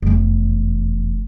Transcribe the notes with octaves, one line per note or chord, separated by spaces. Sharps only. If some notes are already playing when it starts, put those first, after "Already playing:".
F1 E2